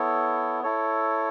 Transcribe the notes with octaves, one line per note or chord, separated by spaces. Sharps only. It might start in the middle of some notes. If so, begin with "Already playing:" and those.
Already playing: B3 E4 A4 C#5
E4 A4 C#5